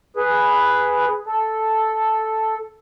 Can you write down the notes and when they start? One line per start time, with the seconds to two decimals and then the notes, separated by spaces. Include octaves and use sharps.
0.16 G#4 B4
1.26 A4